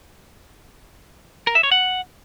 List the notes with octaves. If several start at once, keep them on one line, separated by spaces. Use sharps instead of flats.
A#4
E5
C#5
F#5